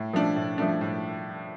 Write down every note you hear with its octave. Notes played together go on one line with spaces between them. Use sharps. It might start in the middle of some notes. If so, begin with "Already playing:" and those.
Already playing: A2
F3 A3 D4
A2
F3 A3 D4
A2